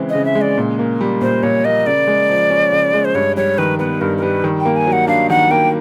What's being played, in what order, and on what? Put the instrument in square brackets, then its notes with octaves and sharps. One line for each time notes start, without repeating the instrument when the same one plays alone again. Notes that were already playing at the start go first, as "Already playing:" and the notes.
Already playing: [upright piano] C#3 E3 G#3 C4
[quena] D#5
[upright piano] C#3
[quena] E5
[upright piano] G#3
[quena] D5
[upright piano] A#2
A#3
G3
[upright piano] A#2 [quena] C5
[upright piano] A#2 [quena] C#5
[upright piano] A#3 [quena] D#5
[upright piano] C#3 [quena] D5
[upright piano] G#3
F3
C#4
C#3
G#3
[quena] C5
[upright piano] G2 [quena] C#5
[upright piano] G3 [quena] C#5
[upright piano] D#3 [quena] B4
[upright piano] B3 [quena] B4
[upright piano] G2 [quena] A#4
[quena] A#4
[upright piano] G3 [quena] B4
[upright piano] D#3
[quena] G5
[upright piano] A#3
[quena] G#5
[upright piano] F#3
[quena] F#5
[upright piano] D4 [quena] F5
[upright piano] D#3 [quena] F#5
[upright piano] A#3 [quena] G5